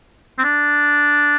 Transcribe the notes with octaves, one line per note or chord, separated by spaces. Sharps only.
C4
D4